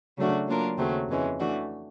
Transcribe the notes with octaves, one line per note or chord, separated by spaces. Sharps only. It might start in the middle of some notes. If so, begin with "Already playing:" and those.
C#3 F#3 A3 D4 F#4
F#3 A#3 D4 F4 A#4
D#2 C#3 F#3 A3 C4
F2 C#3 E3 G#3 C#4
E3 A3 D4 F#4